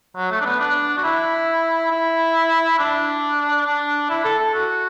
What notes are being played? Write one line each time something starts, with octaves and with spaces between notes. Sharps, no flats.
F#3
A3
D4
B3
D4
F#4
E4
E4
D4
D4
E4
A4
A4
F#4